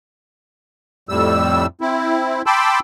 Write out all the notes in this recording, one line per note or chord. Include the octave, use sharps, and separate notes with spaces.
F2 A2 G3 E6
C4 E4
G5 A5 B5 C6 D6 E6